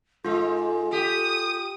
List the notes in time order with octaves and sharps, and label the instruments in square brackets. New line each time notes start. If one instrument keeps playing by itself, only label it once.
[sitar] G#2 G#3 [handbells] F4 [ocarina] A4
[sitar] G4 [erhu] D#6